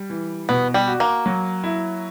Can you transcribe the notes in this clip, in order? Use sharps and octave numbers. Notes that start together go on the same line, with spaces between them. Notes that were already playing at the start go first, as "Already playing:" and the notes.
Already playing: G3
E3
B2 B3
G3
F#4
A#3
F#3
E4